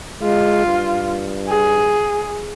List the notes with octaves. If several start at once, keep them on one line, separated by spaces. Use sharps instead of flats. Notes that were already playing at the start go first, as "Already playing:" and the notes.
G#3 F4
G2
G#4